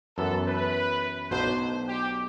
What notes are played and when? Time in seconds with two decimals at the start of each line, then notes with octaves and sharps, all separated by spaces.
0.17 F#2 E3 B3 A4
0.46 B4
1.31 B1 B2 F#3 A3 D4 C5
1.88 G4